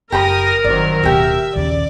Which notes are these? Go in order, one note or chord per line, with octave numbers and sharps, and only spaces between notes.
F#1 G4 A#4 A#5 B5 D#6 A#6
G1 D#3 F#3 C4 D5
D1 B2 F#4 G4 E5
A#1 D#2 C#3 D5